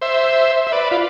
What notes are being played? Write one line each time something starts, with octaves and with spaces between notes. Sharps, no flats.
C5 E5
E5
B4 D5
F4